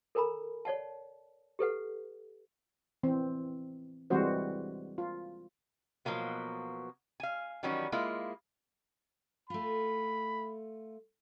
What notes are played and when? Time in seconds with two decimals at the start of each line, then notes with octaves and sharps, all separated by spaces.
0.15 A4 A#4 G#5 A#5 B5
0.65 C#5 D5 F#5 A5
1.59 G4 A4 B4 F#5
3.03 E3 C4
4.10 E3 G3 G#3 C4 F#4 C5
4.98 F4
6.05 B2 F3 F#3 A#3 B3
7.20 F5 G#5
7.63 D#3 E3 F#3 G3 C#4
7.92 G#3 A#3 E4 F4
9.50 A3 F4 B5